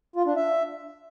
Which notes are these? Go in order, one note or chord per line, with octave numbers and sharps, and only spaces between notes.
F4
D4
E5